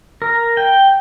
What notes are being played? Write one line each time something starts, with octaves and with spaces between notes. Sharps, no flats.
A#4
G5